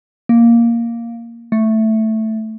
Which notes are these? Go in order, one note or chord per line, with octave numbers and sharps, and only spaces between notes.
A#3
A3